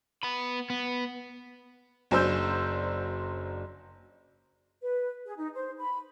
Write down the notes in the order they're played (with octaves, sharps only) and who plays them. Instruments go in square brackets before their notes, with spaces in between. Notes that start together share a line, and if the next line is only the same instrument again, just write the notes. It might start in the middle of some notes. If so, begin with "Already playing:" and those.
[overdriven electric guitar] B3 B5
B3
[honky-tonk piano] F#1 F#3 D4 C5 E6 G6
[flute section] B4
G#4
D#4
C5
B5